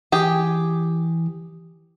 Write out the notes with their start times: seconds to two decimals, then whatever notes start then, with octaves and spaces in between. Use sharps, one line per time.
0.12 E3 G4 G#4